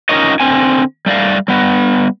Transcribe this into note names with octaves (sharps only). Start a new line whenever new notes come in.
C#4 D#4 F4 A#4 C#5 D#5
D3 C4 G#5
G3 A3 D5 F5
G3 B3